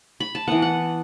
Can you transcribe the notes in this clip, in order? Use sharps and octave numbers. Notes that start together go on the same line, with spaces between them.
B5
A5
E3 B3 F#5
F#5